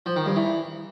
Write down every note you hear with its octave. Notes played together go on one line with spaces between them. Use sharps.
F3
D#3
G2
E3